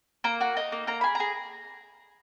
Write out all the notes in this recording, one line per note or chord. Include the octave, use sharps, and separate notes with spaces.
A#3 A#5
F#4
D#4
A#3
A#3 A#5
G#4 B5
G#4 A#5